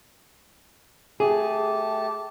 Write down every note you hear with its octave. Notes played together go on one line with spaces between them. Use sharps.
A3 G4 G#4 A5